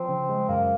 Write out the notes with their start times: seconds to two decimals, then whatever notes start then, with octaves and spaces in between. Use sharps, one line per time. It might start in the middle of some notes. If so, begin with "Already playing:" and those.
Already playing: F3 C4
0.08 C#3
0.29 G#3
0.48 F#2 A#3